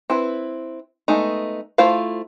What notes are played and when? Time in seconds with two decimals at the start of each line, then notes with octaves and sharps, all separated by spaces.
0.10 C4 E4 B4
1.08 G#3 A3 B3 D#4
1.78 A3 E4 F4 C5 F5